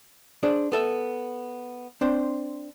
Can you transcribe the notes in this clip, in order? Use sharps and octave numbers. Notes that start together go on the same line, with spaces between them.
D4 G#4 C5 D5
B3 A4 E5
C4 D4 C5